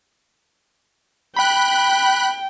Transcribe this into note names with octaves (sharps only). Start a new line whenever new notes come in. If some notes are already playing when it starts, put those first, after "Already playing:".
G5 B5 F#6